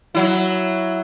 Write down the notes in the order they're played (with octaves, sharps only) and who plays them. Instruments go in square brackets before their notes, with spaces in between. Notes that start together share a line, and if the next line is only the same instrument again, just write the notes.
[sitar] F#3 E4